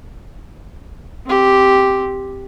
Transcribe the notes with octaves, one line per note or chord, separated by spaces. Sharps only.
C4 G4